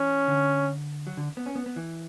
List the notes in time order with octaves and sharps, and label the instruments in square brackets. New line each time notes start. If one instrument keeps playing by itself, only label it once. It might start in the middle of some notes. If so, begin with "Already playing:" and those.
Already playing: [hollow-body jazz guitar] E3 [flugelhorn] C#4
[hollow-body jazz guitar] D3
F#3
D3
B3
C#4
B3
B3
E3